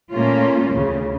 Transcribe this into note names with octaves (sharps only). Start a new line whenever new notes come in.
A#2 A3 A#3 C#4 F4
D2 C#3